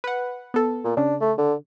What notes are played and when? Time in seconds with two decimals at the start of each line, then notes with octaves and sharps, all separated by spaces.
0.04 B4 F#5
0.54 B3 A4
0.84 A#2
0.97 C#3 D4
1.21 A3
1.38 D3